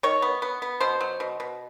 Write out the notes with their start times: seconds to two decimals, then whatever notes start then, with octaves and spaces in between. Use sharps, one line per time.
0.03 D#3 C#5
0.22 B3
0.42 B3
0.62 B3
0.81 B2 C5
1.01 F#3
1.20 B2
1.40 B2